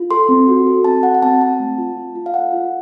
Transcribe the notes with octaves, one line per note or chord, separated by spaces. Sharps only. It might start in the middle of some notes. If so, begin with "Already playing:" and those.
Already playing: F4
A4 C6
C4
F#4
A4
C4 A5
F#4 F#5
F#5
C4 A5
C4 A5
A3
F4
F4
F4
F5
A4 F#5
F4